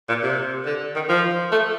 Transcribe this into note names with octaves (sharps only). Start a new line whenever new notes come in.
A#2
C3
D3
D#3
F3
A3